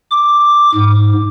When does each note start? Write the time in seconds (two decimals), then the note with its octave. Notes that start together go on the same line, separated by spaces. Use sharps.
0.11 D6
0.74 G#2